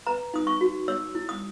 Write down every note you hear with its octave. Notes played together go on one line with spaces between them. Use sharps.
B4 A#5
D#4 D#6
C#6
F#4
C#5 E6
E4
D#6